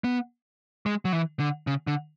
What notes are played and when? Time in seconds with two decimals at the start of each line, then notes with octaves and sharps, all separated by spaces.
0.04 B3
0.86 G#3
1.05 F#3
1.13 E3
1.40 D3
1.67 C#3
1.87 D3